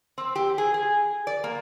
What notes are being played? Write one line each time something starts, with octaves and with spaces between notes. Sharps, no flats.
C4
G4
G#4
G#4
D5
A#3